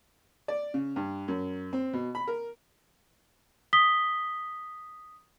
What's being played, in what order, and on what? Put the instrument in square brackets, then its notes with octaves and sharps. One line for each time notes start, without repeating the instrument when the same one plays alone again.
[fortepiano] D5
C#3
G2
F#2
C4
B2
B5
A#4
[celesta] D#6 B6 G7